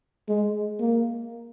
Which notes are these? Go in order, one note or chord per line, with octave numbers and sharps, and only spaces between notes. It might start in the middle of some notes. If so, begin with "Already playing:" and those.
G#3
A#3